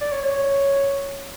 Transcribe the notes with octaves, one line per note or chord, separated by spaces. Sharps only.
D5
C#5
C#5